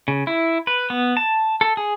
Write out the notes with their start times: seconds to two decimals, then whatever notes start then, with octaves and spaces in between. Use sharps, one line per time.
0.08 C#3
0.27 E4
0.67 B4
0.90 B3
1.17 A5
1.61 A4
1.77 G#4